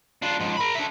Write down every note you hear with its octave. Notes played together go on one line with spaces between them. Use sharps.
D4 F4
G#2 F3
A#4 B5
D4 E5